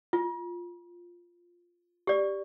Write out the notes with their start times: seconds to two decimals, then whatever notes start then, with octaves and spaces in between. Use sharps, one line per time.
0.13 F4
2.07 G4 D5